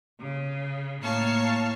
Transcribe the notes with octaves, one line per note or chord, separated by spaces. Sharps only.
C#3
A2 A#3 C#5 F5 A5 C#6